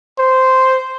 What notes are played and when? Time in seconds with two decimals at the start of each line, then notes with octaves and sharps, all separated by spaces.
0.19 C5